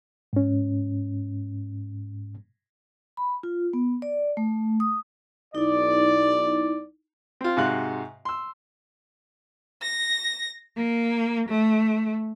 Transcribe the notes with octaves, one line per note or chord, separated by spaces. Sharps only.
G#2 C#4
B5
F4
B3
D5
A3
D#6
B1 D#4 E4 D5
C4 F4
G#2 C3 F#4 F5 C6 F#6
C6 E6
A#6
A#3
A3